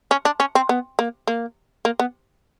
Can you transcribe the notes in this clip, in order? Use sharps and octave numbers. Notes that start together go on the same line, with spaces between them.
C#4
D4
C#4
C4
B3
A#3
A#3
A#3
B3